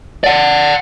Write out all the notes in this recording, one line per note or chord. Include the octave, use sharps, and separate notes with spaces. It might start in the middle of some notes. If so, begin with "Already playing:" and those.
D5 F#5